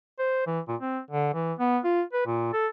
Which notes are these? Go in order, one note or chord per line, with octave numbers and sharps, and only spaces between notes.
C5
E3
A#2
C4
D3
E3
B3
F4
B4
A#2
A4